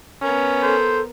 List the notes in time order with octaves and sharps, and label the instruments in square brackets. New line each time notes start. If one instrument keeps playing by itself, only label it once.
[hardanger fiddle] B3 A#4 [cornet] C#4
[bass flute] A4 [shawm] C5